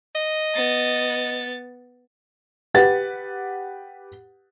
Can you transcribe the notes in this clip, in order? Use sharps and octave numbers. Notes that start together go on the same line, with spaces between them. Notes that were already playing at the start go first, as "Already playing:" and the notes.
D#5
B3 A6
G4 B4 F#5 A6